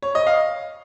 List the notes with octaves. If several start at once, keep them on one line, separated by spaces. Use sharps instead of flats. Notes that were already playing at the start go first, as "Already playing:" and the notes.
C#5
D#5
F5